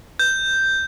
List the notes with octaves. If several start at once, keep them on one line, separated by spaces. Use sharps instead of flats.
G6